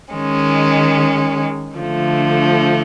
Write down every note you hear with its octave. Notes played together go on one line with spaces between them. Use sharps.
D#3 G#3 C#4
D3 F3 A3